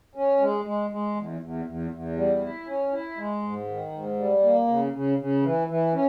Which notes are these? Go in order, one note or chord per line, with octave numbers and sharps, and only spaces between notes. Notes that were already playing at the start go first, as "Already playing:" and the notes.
C#4
G#3
G#3
G#3
E2
E2
E2
E2
G3
E4
C#4
E4
G#3
G#2
D#3
G#2
G3
A#3
C#3
C#3
C#3
E3
E3
C#4